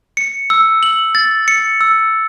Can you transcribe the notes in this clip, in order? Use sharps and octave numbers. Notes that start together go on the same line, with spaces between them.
C#7
E6
F#7
A6
C#7
E6